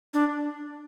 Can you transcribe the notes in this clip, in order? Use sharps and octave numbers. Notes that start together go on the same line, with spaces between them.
D4